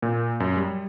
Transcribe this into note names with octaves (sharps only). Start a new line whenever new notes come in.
A#2
F#2
G3